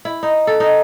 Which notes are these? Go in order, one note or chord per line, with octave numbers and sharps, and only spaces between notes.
E4
D#4
A4
D#4